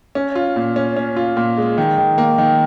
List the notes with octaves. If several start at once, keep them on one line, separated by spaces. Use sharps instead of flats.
C#4
F4
A#2
C#4
C#4
F4
A#2
G#3
D#3
D#3
A#3
D#3